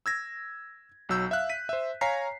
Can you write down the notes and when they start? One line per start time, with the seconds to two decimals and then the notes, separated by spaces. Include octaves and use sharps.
0.06 E6 G#6 A#6
1.09 B1 F#3 E6 G6
1.31 E5 F5 F#6
1.49 B6 D#7
1.69 C5 E5
2.01 C#5 F5 G#5 A#5 B6 C7